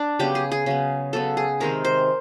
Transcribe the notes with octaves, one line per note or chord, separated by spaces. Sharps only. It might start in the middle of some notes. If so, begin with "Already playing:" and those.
Already playing: D4
C#3 F#3 B3 G4
G#4
G#4
C#3 F#3 B3
C#3 F#3 B3 A4
G#4
C3 D#3 G#3 C4 A#4
C5